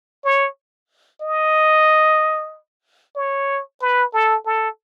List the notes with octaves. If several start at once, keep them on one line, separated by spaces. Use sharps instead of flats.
C#5
D#5
C#5
B4
A4
A4